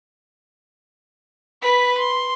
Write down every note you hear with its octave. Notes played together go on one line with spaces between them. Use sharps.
B4 B6
C6